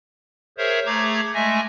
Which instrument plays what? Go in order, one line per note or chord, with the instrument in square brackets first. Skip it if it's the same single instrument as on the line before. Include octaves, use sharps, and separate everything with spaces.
[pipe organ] G#4 A#4 C5 C#5 E5
A3 G#4 A#5 D6 G#6
G#3 A3 E5 G#5 A#6